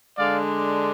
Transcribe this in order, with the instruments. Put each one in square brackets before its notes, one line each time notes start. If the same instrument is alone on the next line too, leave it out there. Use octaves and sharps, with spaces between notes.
[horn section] D3 G#3 D4 D5 F5